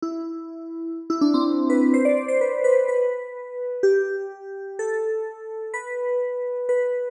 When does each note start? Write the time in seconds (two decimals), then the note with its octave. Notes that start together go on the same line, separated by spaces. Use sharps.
0.02 E4
1.10 E4
1.21 D4
1.34 C4
1.70 B4
1.94 C5
2.05 D5
2.17 D5
2.28 C5
2.41 B4
2.64 B4
2.88 B4
3.83 G4
4.79 A4
5.74 B4
6.69 B4